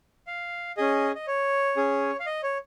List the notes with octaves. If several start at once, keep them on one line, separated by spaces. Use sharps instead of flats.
F5
C#4 G#4 D#5
D#5
C#5
C#4 G#4
F5
D#5
C#5